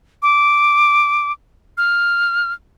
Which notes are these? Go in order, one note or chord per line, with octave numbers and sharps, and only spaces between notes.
D6
F6